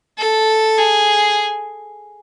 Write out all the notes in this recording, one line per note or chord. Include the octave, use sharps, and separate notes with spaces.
A4
G#4